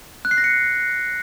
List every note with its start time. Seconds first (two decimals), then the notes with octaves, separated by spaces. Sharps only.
0.25 F#6
0.31 C7
0.38 A#6
0.44 C#7